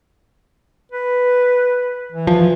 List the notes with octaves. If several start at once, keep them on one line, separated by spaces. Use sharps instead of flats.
B4
E3
F3